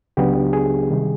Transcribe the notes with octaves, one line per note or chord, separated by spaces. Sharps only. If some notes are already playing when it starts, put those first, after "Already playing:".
C#2 C#3 F#3 B3 D4 G4
G#4
C3 D#3 G3